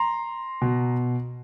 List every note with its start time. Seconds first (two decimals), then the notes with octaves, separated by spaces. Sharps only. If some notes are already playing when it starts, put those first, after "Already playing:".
Already playing: A#5 C6
0.61 B2